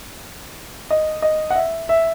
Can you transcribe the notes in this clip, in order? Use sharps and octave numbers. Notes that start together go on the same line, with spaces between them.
D#5
D#5
F#5
E5
E5